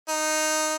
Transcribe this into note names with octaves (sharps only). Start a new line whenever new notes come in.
D#4